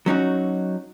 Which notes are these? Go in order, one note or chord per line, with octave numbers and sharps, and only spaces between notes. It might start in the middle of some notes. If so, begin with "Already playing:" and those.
F#3 C#4 D#4 F#4